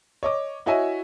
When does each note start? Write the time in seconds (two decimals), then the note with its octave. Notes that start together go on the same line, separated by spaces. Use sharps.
0.23 C#5 D#5 D6
0.66 E4 F#4 C#5 D#5 E5 G#5